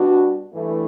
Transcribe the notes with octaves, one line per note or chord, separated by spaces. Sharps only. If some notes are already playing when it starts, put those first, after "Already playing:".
Already playing: B2 G3 D4 F#4
G2 E3 A3